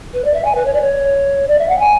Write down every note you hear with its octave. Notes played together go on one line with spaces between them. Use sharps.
B4
D5
E5
G#5
B4
C#5
D5
C#5
D5
E5
F#5
G#5